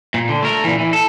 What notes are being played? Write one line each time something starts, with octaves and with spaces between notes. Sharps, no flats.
A#2
D3
A3 A#4
A#2 E3
E3
A4